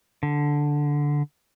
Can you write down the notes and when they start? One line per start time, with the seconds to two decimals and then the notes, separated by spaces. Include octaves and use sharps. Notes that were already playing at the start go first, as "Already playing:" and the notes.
0.23 D3